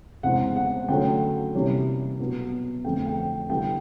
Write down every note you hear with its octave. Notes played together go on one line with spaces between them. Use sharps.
E2 C#3 E3 G#3 C4 F#5
F#5
D3 F#3 A3 C#4 G5
C3 E3 G3 A#3 C#4
B2 F#3 B3
F2 D3 F3 A3 G5
G5
D3 G3 B3 E4 G5